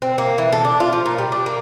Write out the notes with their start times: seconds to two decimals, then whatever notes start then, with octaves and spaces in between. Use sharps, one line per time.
0.02 C4
0.18 A#3
0.38 E3
0.53 A4
0.65 D4
0.80 F4
0.93 F3
1.06 A#2
1.18 G3
1.32 D4
1.46 A#3